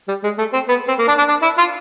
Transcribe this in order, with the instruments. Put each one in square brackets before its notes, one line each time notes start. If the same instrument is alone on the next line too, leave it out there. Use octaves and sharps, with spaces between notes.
[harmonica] G3
G#3
A3
C4
B3
C4
A#3
D4
D4
D4
E4
F4